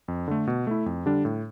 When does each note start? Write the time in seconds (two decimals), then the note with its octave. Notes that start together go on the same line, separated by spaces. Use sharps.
0.08 F2
0.28 D3 A3
0.47 B2
0.67 A3 E4
0.86 F2
1.06 D3 G3 D4
1.25 A2